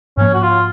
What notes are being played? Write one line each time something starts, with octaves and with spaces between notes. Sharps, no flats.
G#2 F3 A#3 C#4
F#4
F4